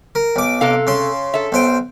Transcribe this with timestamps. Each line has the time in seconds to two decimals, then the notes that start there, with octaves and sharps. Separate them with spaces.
0.15 A#4
0.36 B1 D6
0.61 C3 A4 F5
0.87 C#3 C6
1.34 A4 E5
1.52 B1 C5 G5